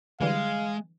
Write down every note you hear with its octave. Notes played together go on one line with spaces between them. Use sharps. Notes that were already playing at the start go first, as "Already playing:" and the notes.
D3 E3 G3 G#3 F5